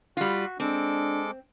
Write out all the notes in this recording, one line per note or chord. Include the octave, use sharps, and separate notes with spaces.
G3 F4 F#4
G#3 C4 D4 A4 D6